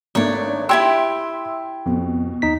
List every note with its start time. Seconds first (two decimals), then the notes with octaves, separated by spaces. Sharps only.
0.15 G#1 A3 D4 C#5 D5
0.69 E4 F#4 G4 E5 C6 E6 G#6
1.86 F2 B2
2.42 D#2 D#4 B6